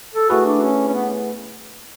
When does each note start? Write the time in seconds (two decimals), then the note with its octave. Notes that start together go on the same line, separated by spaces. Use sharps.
0.14 A4
0.30 A3 E4 F#4 G#4 B4
0.46 D4
0.62 C#4
0.88 C#4
0.93 B3